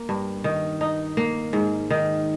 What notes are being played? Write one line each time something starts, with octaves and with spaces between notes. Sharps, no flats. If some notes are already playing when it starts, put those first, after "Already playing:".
Already playing: A#3
G2
D#3
D#4
A#3
G#2
D#3